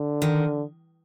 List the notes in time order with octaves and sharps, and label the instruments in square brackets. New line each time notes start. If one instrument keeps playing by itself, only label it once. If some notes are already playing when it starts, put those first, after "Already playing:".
Already playing: [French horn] D3
[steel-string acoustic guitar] D#3